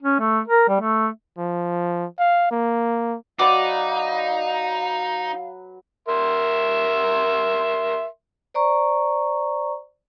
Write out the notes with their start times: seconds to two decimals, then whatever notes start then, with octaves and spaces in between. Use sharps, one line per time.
0.03 C#4
0.20 A3
0.48 A#4
0.68 G3
0.81 A3
1.39 F3
2.19 F5
2.51 A#3
3.39 F#3 D#4 B4 D5 F5
6.08 A#4 E5 C6
8.54 C5 D5 A#5 C#6